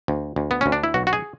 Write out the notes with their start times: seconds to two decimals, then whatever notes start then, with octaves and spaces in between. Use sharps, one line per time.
0.08 D2
0.36 D2
0.51 B3
0.61 D2 C#4
0.72 D4
0.84 E4
0.94 B1 F#4
1.07 F#4
1.13 G#4